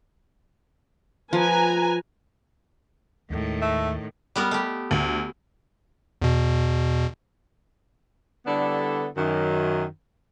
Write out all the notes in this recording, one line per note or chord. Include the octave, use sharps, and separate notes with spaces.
F3 B4 G#5 A#5
D#2 A2 D#3 G#3
A3
G3 B3 A#4
A3 G4
D2
E2 B2
D3 G3 B3 D4 E4 A4
F#2 D#3